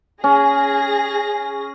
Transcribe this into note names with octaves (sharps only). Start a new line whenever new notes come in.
C#4 G#4 A#6